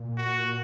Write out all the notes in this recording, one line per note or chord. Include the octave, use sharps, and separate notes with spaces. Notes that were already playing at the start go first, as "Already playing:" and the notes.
Already playing: A#2
F#4